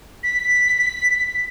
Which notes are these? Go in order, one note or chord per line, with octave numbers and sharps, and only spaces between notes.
B6